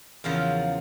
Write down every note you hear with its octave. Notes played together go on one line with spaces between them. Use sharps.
E2 C#3 F3 A#4